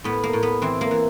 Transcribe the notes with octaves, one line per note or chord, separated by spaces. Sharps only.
A2 B3
A#3
A2
B3
E3 C4
A#3
E3